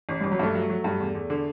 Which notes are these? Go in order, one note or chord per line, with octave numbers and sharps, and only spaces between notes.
A1
A1 G3
F#3
G2 A3
F#3
F#3
G2
E2
E2
D3